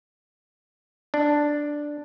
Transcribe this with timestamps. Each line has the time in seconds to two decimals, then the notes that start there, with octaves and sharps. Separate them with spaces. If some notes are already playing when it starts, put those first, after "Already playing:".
1.14 D4